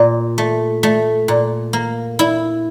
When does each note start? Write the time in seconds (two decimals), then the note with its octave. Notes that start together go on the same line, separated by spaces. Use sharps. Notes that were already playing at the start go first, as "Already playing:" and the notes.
Already playing: A#2
0.38 A3
0.83 A3
1.28 A#2
1.73 A#3
2.19 E4